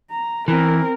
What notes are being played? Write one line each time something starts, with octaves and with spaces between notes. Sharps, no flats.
A#5
E3 C4 A#4